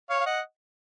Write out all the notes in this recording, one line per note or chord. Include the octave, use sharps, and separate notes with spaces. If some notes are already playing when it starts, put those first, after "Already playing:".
C#5 F5
F5
D#5 F#5